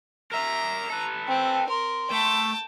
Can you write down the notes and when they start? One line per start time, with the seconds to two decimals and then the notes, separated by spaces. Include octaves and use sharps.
0.32 A#4 E5 A#5
0.90 A4 B4
1.28 C4 G5
1.69 A#4 C6
2.11 A3 G5 A5